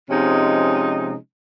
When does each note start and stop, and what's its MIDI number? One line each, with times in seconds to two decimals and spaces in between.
0.09 1.15 48
0.09 1.15 53
0.09 1.15 56
0.09 1.15 61
0.09 1.15 63